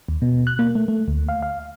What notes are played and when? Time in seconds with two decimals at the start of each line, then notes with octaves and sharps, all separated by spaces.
0.08 D#2
0.22 B2
0.47 F#6
0.59 A#3
0.75 A3
0.88 A3
1.08 D2
1.29 F5
1.42 F5